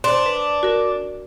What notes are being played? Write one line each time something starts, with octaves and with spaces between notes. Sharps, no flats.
D4 C5 D5 C6
B4
F#4 A#4